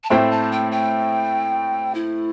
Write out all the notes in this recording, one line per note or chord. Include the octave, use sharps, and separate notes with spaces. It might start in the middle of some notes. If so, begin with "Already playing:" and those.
A5
A2 A3 C4 E4 C5 G5
A5
G5
G5
E4